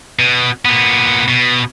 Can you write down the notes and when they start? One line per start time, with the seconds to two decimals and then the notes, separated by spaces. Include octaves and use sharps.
0.19 B2
0.65 A#2 B3
1.28 B2